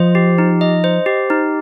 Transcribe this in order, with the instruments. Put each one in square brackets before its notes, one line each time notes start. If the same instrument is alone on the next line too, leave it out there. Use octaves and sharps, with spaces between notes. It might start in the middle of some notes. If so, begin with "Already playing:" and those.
Already playing: [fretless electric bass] F3 [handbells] C5 D#5
[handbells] G4
D#4
D#5
C5
G4
D#4